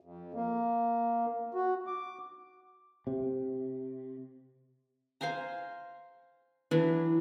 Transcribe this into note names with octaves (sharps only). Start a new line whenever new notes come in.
F2
A#3
F#4
D6
C3
C5 F5 G#5 A#5
E3 F#3 D4 E4